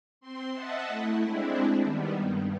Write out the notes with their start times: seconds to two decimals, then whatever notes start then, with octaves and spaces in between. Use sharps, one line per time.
0.21 C4 C6
0.53 D#5 E5 F#5 A5
0.88 A3 E4
1.22 G#3 C4 D4 E4
1.83 D#3 G3 B3
2.20 G2